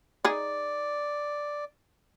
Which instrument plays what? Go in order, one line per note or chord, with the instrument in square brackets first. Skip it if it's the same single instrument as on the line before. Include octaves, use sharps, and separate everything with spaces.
[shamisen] D#4 G#4 [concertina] D5